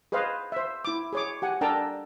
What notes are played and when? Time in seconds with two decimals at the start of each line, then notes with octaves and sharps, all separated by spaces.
0.12 G#4 B4 C5 D#5 F5
0.52 C5 E5
0.85 E4 D6
1.13 G#4 C#5 D6
1.42 G4 F#5 G#5
1.61 D4 A4 A#4 G5 A5 A#5